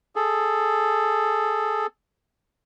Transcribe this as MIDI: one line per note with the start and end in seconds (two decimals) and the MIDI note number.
0.16 1.86 68
0.16 1.86 69